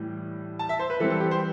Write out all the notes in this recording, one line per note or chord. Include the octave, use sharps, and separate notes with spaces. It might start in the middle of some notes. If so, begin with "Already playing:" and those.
Already playing: A2 E3 G3
A5
E5
C5
B4
E3 G3 C4 A4
A4
G4
C5